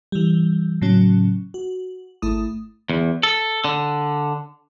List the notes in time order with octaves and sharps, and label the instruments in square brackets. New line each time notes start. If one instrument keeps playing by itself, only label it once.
[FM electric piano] E3 G3
A2 C#3 F#3 C#4
F#4
G#1 A3 E4 D#6
[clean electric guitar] E2
A4
D3